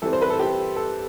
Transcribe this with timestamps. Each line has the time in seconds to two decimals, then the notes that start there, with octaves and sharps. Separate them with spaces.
0.02 E3 G3 C4 A4
0.13 C5
0.22 B4
0.30 A4
0.40 G4
0.76 A4